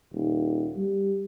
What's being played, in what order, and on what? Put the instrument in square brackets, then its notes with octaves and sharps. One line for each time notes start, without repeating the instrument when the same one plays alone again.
[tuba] D#1
G3